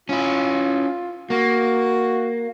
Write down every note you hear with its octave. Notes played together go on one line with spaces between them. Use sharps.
C#4 E4 F4
A#3 F#4